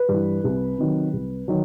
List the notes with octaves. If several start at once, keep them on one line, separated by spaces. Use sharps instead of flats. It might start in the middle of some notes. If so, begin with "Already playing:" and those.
Already playing: B4
G2 E3
C2
C3 D#3 F#3
C2
D#3 F#3